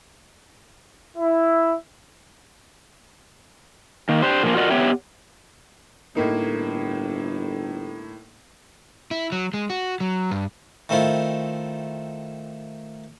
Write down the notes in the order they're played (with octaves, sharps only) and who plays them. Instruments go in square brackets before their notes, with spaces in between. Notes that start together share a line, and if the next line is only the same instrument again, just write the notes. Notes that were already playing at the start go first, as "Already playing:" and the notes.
[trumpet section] E4
[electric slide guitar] D#3 A#3
D4 G4 C5
A#2 F3 A#3
F4 F#4 A#4 D5 D#5 F#5
B3 G4 C#5 E5 G5
[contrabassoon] G1 [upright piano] A2 A#3 D#4
[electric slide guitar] E4
F#3
G#3
F#4
F#3
G2
[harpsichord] D#3 A3 C4 E4 F4